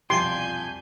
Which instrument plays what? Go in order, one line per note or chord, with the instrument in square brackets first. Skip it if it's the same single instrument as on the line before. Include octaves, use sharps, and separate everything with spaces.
[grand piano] E1 C2 F2 [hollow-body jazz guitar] F4 G4 [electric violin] G#5 G6 [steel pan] C6